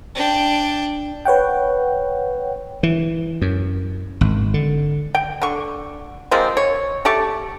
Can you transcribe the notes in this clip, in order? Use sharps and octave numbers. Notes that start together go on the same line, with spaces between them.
D4 G5
B4 C#5 F#5 G5
E3
F#2
G#1
D3
G5
D3 C#6
F3 G#3 A#3 C4
C#5
A3 G4 A5 C#6